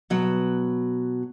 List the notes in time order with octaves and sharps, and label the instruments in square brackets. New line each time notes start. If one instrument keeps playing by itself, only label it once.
[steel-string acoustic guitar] B2 F#3